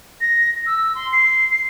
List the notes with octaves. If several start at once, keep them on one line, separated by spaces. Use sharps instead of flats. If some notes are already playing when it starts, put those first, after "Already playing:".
A#6
E6
C6
C7
C7